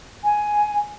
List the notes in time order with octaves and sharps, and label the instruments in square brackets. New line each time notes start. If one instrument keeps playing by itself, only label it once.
[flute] G#5